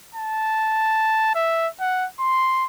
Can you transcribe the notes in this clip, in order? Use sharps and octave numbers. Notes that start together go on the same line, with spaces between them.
A5
E5
F#5
C6